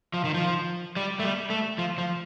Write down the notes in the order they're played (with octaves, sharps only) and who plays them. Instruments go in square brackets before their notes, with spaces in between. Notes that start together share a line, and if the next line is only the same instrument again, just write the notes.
[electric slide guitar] F3
D#3
F3
G3
A3
G3
A3
F3
F3